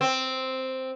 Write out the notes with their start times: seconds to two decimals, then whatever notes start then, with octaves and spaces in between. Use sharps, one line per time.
0.01 C4